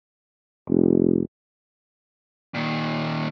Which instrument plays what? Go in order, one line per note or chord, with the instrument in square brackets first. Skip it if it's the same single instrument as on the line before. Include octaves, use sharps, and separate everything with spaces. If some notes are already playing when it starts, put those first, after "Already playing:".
[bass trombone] F1
[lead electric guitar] A#2 D#3